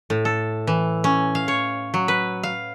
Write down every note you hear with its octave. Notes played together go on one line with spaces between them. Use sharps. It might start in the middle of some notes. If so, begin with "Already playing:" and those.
A2
A4
E3
C#4
F5
C#5
F#3
B4
F5